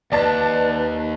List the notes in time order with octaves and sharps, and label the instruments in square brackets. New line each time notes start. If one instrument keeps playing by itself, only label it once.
[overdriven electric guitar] D#2 [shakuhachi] B4 [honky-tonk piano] D5 A5 A6